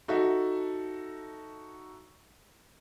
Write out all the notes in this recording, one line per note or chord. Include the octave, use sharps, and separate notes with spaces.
D#4 F#4 A4 E5